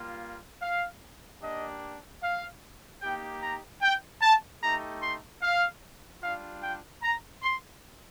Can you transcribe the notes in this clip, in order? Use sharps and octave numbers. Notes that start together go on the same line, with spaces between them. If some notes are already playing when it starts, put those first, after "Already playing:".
Already playing: G3 A#3 F4
F5
A#3 D4 G4 D#5
F5
A#3 D#4 G4 G5
A#5
G5
A5
A3 D#4 G4 A#5
C6
F5
G3 D4 F4 F5
G5
A#5
C6